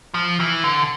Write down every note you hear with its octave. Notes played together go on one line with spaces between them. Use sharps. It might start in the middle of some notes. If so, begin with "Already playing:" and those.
F3
E3
D3